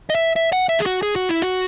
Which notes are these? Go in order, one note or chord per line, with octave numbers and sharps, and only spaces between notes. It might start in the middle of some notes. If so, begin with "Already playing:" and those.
D#5
E5
E5
F#5
E5
G#4
F#4
G#4
F#4
E4
F#4